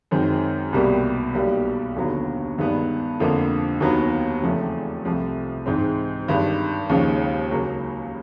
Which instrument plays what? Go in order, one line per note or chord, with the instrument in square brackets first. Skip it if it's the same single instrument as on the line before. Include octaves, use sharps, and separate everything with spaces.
[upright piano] F#2 D#3 G#3 C4
C2 B2 G3 A#3
B1 B2 G3 A#3
D#2 D3 F#3 B3
G2 D#3 G#3 B3 D4
F2 D3 F3 A#3
D#2 D#3 F#3 B3
E2 C#3 F3 A3 C4
C2 C3 F3 A3
G#2 E3 G#3 C4
G#1 G2 D#3
D#2 C#3 F3 G#3 C#4
C#2 C#3 F#3 A#3